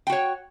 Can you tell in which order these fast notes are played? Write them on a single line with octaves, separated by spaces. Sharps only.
G5 F#4 C#5